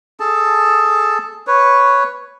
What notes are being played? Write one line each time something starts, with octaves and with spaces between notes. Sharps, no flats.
G#4 A4 A5
B4 C#5